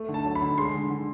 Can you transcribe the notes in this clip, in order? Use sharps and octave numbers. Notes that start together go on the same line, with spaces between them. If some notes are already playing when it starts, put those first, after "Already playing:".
Already playing: A3
D3
A5
F#3
B5
D3
G#3 C6
D3
D3